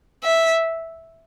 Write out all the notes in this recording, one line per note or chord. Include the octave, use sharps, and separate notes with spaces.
E5